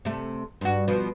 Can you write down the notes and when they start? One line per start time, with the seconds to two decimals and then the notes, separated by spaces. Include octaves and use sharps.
0.05 C3 A3
0.61 G2 F#4
0.88 B2 F3